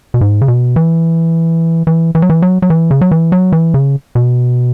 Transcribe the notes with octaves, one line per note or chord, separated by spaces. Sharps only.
B2
G#2
C#3
B2
E3
E3
E3
F#3
E3
F#3
F#3
E3
C#3
F#3
E3
F#3
E3
C#3
B2